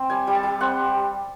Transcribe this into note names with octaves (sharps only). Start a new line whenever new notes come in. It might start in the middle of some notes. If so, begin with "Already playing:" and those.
Already playing: C4
G3 G#5
G3
A5
G3
C4 F#5